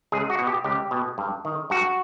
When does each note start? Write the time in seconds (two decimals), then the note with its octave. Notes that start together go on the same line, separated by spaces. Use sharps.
0.12 C#2 G#4
0.30 F#4
0.39 B2
0.47 G4
0.64 C#2 G4
0.91 B2
1.18 G2
1.45 D#3
1.70 G2 F#4